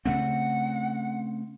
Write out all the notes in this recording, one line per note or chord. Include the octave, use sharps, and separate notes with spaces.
C#3 A3 C4 F#5